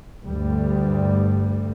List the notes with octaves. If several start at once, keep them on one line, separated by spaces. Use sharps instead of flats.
D2 G2 G3